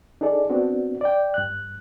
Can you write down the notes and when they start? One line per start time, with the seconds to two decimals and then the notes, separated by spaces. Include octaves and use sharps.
0.21 D4 D#4 G#4 A4 D5
0.50 B3 C4 D4 F#4
1.01 D5 G5
1.34 G2 F#6